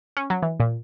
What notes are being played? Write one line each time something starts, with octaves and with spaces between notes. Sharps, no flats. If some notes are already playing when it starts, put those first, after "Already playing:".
C#4
F#3
E3
A#2